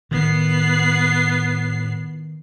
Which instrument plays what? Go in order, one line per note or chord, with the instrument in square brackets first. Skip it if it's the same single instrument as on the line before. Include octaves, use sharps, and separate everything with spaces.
[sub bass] A2 [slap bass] D#3 [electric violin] B3 C7